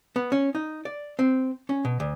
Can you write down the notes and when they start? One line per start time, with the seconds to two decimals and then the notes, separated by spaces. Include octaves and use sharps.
0.16 B3
0.32 C#4
0.55 D#4
0.85 D5
1.19 C4
1.69 C#4
1.85 B2
2.00 D2